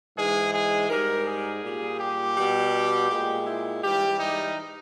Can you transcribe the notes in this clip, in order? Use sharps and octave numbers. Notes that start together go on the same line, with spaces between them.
G#2 E3 G#3 G#4
G#4
G#2 G3 A#4
G#4
A#2 G3
G4
B2 G3
A#2 G#3
E4
G#2 E3 G3 G4
D#4